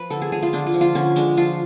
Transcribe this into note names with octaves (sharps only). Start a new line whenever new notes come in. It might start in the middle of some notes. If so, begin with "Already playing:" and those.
Already playing: F3 B4
D3 A4
G#4
G#3 G#4
F4
D3 D4
F4
F3
F4
D3 C#4
G#3 D4
F3 F4